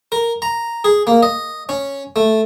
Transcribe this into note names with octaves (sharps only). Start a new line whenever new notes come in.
A#4
A#5
G#4
A#3
D#5
C#4
A3